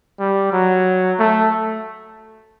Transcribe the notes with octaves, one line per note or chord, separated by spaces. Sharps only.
G3
F#3
A3